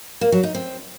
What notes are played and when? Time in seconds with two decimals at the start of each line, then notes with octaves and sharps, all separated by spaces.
0.21 A#3
0.32 F#3
0.43 D#4
0.55 C4